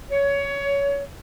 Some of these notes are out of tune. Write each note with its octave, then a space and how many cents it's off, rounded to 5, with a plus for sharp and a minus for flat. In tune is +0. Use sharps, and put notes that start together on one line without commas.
C#5 +20